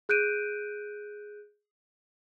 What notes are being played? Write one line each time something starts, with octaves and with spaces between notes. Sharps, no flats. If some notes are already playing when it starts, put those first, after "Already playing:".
G#4 F#6 G6 D7 D#7